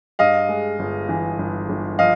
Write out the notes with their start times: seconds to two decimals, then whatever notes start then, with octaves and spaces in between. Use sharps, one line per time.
0.19 G2 D#5 F5
0.49 G#3
0.79 G1
1.09 E3
1.39 G1
1.69 G1
1.99 F3 D#5 F5